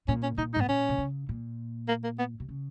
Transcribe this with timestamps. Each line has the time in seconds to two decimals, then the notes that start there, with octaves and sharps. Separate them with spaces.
0.08 A#2 C#4
0.23 C#4
0.38 A#2 D#4
0.54 D#4
0.56 G#2 B3
0.68 A#2 C#4
0.89 B2
0.98 C#3
1.29 A#2
1.88 A#3
2.04 A#3
2.19 B3
2.40 B2
2.49 C#3